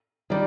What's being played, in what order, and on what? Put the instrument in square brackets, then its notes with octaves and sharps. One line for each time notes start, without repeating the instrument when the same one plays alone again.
[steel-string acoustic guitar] D#3 G3 [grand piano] D5